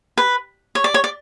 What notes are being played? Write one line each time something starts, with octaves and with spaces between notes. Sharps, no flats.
B4
C#5
D5
C#5
D5